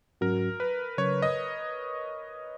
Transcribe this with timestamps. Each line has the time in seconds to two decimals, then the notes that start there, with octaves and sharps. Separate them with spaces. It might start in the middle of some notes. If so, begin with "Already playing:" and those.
0.21 G#2 F#3 C#4 F#4 A#4
0.60 B4
0.98 C#3 F#3 C#4 C#5
1.22 D#5